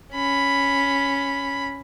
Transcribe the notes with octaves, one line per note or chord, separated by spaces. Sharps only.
C#4 B5